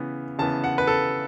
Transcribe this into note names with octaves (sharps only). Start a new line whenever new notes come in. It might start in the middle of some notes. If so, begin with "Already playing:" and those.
Already playing: C#3 E3 B3
C#3 E3 B3 A5
F#5
B4
A4